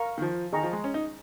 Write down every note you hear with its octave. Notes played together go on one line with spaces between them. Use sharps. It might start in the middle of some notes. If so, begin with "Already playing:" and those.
Already playing: A#4 F5 A#5 C#6
D#3
F3
D#3 G#4 D#5 G5 A#5 C#6
F3
G#3
C#4
D#4